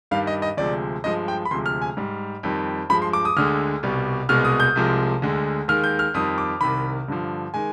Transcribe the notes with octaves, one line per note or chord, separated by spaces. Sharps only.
G2 D#3 G3 F5
D#5
D#5
D2 C3 F3 G#3 D5
G2 F3 G#3 D#5
G5
B5
D2 C3 F3 G#3 C6
F6
G#5
G#2 G3
F2 D#3 G3
G2 F3 G#3 B5
C6
D6
D#6
D2 D3 G#3 F6
C2 B2 G3
C2 B2 G#3 F6
D#6
G6
C2 C3 F3 G#3
D2 D3 G#3
D#2 D#3 G#3 F6
G6
F6
F2 D#3 G3 D#6
D6
C2 C3 D#3 B5
G2 D3 F3
D#3 G#3 G#5